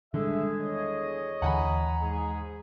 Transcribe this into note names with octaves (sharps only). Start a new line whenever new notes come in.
D3 D#3 G3 G#3 G#4 E5
E2 C#5 D#5
D#2 D3 E3 F#5 G#5 A#5 B5
G#2 G#4